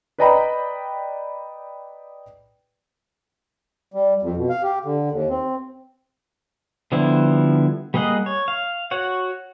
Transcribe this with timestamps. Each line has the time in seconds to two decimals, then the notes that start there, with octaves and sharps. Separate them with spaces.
0.19 B4 D5 D#5 G5 A#5 B5
3.94 G3
4.22 F2
4.37 B2
4.49 F5
4.63 G4
4.85 D3
5.12 D#2
5.30 C4
6.92 D3 F3 G3 B3 E4
7.94 G3 A#3 G#4 D#5 F#5
8.26 C#5
8.48 F5
8.91 F#4 C#5 F#5